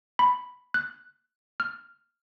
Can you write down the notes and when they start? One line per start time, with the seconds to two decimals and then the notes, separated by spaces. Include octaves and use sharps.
0.19 B5
0.74 F#6
1.60 F6